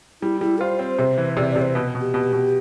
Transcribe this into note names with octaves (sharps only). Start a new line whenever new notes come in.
G3 E4
G3 E4
F4 C5
C4
C3
E3
C3 D5
D5
C3
C5
B2 B4
B2
G4
B2
B2